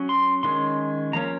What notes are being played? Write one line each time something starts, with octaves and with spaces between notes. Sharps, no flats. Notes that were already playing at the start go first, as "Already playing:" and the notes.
Already playing: F#3 C#4
C6
D#3 G#3 C#4 C6
F3 A#3 C#4 A#5